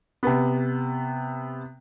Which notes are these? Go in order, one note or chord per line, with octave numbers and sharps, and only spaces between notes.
C3 B3